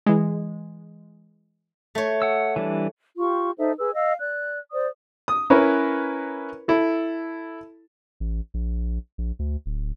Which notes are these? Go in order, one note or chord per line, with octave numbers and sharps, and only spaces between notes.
E3 G#3
A3 C#5
F#5 E6
E3 G3 D4
F4 G4 C#6
D#4 A4 C5 E5
G#4 B4 E6
D#5 F5 E6
D5 F#6
C5 D5 D#6
D#6
C#4 E4 A#4 B4 C#5
E4 A4
A1
A#1
A#1
D2
D1